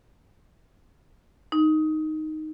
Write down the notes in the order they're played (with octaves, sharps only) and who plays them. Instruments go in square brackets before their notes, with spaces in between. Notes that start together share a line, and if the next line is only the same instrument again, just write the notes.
[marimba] D#4